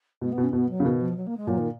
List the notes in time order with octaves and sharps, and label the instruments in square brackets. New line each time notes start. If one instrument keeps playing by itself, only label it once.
[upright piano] B2 [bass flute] G#3
[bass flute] B3
[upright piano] B2
[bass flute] C#4
[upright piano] B2 [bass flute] B3
[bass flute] F#3
[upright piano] C#3
[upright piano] B2 [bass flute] D#3
[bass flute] F3
F#3
A#3
G#3
[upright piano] A#2 [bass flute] F#3
[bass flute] D#3